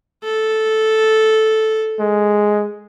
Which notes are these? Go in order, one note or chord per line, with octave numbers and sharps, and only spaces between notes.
A4
G#3